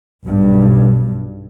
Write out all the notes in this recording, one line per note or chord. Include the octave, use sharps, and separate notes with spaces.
B1 G2